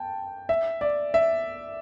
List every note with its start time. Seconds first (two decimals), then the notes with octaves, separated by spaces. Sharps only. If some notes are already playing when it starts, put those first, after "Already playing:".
Already playing: G5 A5
0.49 E5
0.81 D5
1.14 E5